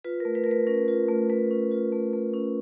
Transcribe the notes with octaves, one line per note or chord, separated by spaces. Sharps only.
F4 B4
A3 A#4
B4
A#4
A3 B4
C#4 A#4
F4
A3
A3 B4
C#4
F4
A3
A3
C#4